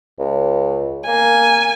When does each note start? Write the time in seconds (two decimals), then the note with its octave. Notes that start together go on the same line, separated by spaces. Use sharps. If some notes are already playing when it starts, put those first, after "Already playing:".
0.19 C#2
1.07 A#3 G#5